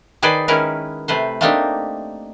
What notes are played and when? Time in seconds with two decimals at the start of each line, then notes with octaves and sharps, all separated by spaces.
0.22 D#3 G#4 B4 C5 D5
0.48 D#3 G#3 C#4 E4 A#4 B4
1.08 C3 A3 B4 C5
1.41 A3 A#3 C4 D4 D#4 G4